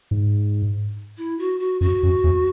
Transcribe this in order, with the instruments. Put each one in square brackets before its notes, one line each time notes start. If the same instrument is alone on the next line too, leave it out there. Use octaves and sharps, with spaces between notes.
[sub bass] G#2
[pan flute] E4
F#4
F#4
[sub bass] F#2 [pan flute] F#4
[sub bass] F#2
E2